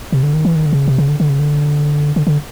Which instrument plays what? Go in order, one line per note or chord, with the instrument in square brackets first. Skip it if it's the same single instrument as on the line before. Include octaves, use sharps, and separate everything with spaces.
[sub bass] C3
D3
D#3
E3
D#3
D3
C3
C#3
C3
C#3
D3
D3
C#3
D3
D3
D3